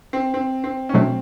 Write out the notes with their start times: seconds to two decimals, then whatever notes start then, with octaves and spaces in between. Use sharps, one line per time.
0.13 C4
0.34 C4
0.64 C4
0.89 C#4
0.94 B2 F#3 A3 C4 D4